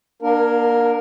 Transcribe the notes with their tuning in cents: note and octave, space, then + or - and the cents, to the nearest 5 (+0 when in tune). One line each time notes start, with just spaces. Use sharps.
A#3 +35 D4 +25 A#4 +0